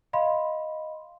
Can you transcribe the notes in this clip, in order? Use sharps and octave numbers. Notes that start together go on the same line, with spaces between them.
D#5 F5 B5 C6